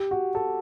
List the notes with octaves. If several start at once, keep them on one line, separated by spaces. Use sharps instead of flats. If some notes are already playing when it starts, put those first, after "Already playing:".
Already playing: G4
F#4
A4